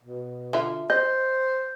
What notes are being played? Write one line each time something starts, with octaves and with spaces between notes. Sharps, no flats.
B2
D3 F4 E5
C5 D#5 G6